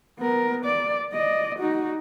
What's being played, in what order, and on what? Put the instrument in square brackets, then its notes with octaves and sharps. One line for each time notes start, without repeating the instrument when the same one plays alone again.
[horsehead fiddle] B3 A#4
D5
D5 D#5
D#4 F#4